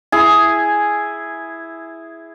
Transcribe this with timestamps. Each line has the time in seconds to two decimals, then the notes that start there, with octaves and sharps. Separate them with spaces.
0.12 E4 G#4